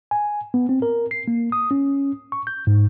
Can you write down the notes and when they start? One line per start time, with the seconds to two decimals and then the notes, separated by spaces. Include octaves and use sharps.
0.11 G#5
0.54 B3
0.69 C4
0.82 A#4
1.11 C7
1.28 A#3
1.52 D#6
1.71 C#4
2.32 C#6
2.47 G6
2.67 G#2